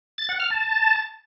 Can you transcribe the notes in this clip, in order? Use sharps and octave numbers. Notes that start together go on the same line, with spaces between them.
A6
F#5
F6
A5